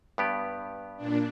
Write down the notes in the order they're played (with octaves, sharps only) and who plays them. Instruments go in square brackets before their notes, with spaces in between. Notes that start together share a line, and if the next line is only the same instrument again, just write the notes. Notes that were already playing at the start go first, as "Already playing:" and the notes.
[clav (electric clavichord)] G2 B3 G4
[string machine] A#2 D4